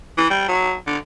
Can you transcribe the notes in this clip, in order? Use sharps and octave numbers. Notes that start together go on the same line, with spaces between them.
E3
G3
F#3
D3